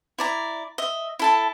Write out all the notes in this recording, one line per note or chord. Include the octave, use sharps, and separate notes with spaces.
E4 D5 A#5
D#5 E5
E4 A4 A5